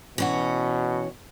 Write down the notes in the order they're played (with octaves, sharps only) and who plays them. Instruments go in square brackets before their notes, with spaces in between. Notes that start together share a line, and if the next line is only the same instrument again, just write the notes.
[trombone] B2 [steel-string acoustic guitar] E3 C#4 F#4